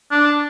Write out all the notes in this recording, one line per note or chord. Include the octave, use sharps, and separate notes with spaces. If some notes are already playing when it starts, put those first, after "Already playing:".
D4